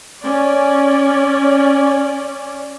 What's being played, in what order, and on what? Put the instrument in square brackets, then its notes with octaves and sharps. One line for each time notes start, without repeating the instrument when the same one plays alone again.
[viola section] C#4 D5